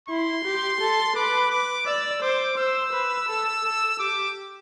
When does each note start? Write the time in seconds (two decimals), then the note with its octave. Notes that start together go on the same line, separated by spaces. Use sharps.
0.09 E4 C6
0.44 G4
0.81 A4
1.16 B4 D6
1.51 D6
1.87 D5 E6
2.22 C5 D6
2.58 C5 E6
2.93 B4
3.29 A4
3.64 A4
3.99 G4 D6